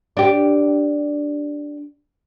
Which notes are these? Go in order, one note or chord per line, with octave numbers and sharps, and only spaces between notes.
D4 G4